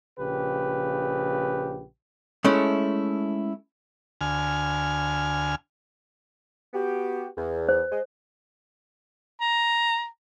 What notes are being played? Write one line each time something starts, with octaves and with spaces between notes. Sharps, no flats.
A#1 C#3 G4 B4
G#3 A3 C#4 E4 A4
D2 G#5 F6
B3 F#4 G4
E2
C5
G#3 D#5
A#5